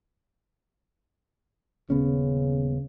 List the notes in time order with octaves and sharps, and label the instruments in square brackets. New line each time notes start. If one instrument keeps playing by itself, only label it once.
[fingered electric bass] D#1 B3 C#4 [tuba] C#3